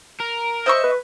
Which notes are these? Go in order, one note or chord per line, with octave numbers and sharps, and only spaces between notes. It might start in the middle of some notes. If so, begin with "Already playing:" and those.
A#4
C5 D#5 E5 C#6
B4